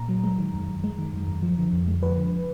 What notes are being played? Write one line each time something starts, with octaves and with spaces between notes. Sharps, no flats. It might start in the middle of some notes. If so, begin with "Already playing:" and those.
Already playing: A#2 A#5
F#3
G#3
D#3
F#2
F#2
G#3
D#3
F#2
F#2
F3
D3
F2
G#3
F3 B4
D3